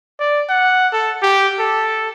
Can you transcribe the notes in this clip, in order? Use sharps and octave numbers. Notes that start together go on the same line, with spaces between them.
D5
F#5
A4
G4
A4